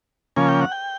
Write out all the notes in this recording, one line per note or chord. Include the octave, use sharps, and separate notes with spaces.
C#3 F3 A#3 C#4 G#5
G5
F#5
G5